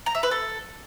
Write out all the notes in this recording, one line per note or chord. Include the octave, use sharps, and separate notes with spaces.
A#5
E5
B4
A4